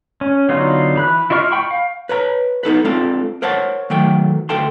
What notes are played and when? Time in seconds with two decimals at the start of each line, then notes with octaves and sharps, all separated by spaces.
0.21 C#4
0.49 D3 F#3 B3 D#4 F4
0.96 E3 B5 F#6
1.30 E4 F4 D#5 C#6 F6
1.52 G5 B5 C#6
1.71 F5
2.09 B4 C#5 A#5
2.63 B3 D#4 A4 B4
2.84 G#3 C4 D4 F4 A4
3.42 A#4 C5 C#5 F#5 A5
3.90 D#3 F#3 A3 G5
4.49 D2 A4 G5 A5 C6